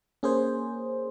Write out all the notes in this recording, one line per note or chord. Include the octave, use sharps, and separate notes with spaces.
A#3 C#4 G#4 C5